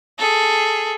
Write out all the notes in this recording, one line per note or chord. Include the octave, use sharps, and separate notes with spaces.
G#4 A4